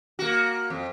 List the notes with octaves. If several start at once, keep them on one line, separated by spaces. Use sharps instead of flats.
A#3 F#4
F2